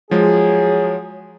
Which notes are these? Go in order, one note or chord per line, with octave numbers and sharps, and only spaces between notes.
F3 F#3 G#3 G#4